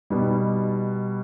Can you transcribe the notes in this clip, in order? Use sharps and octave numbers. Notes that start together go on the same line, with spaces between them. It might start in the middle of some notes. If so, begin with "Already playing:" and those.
B2 G3 B3 D#4